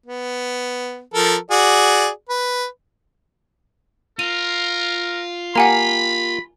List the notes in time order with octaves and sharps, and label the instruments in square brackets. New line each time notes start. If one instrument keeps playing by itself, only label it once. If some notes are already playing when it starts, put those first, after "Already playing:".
[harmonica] B3
F3 A4 A#4
F#4 G#4 D5
B4
[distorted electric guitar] F4 [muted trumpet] A#4 [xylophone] D#7
[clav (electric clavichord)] A#3 G4 [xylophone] F#5 G#5 A#5 [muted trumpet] B5